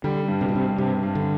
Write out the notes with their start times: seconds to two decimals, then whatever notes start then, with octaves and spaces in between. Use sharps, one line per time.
0.04 D3 G3
0.28 G2
0.41 C3
0.49 B2
0.53 G2 C3
0.78 G2 C3
1.03 G2
1.15 D3